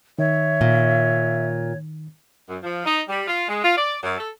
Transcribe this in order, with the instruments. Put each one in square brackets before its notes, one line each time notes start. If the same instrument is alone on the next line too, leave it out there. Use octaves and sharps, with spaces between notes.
[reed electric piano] D#3 [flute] C#5 [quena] E5
[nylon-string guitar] A#2
[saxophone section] F#2
F3
D#4
G3
F4
G#3
F4
D5
F#2
A4